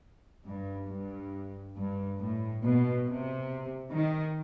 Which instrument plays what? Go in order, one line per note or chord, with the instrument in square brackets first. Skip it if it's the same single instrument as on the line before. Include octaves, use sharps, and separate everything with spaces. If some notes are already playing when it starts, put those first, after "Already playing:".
[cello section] G2
G2
G2
A2
B2
C3
D#3